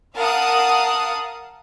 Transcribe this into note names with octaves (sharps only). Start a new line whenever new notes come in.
A#4 F5 F#5 A5 D#6